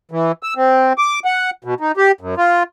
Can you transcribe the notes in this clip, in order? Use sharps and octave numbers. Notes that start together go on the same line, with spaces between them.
E3
E6
C4
D6
F#5
B2
D#4
G4
F#2
F4